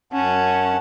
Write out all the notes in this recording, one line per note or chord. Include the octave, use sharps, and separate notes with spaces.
F#2 C#4 F#5 A5